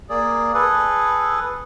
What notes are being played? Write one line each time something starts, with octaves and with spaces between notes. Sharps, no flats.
A#3 G#4 D5
G#4 A4 B4